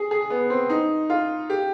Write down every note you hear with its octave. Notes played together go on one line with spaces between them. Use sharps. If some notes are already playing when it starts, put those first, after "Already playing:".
Already playing: G#4
G#4
B3
C4
D#4
F4
G4